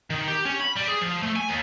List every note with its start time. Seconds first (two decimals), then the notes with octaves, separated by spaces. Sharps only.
0.10 D#3
0.28 G4
0.45 C#4
0.60 B5
0.76 G3
0.88 G#4
1.02 F3
1.22 A3
1.36 G#5
1.48 D#2